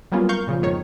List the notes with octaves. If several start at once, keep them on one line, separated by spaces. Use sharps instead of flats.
F#3 G3 A#3 B3 C#4 F4
A#4 F5 C#6 G6
A#2 C#3 F3
F2 G#2 D#3 C#5